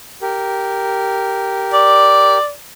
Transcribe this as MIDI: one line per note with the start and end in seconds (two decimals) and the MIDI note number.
0.22 2.38 67
0.22 2.38 70
1.73 2.52 74